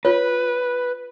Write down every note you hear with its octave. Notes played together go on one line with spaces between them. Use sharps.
F4 B4 C#5